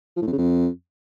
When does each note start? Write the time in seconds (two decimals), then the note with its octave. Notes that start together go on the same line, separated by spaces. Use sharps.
0.16 F3
0.22 A2
0.27 F2
0.33 C#3
0.38 F2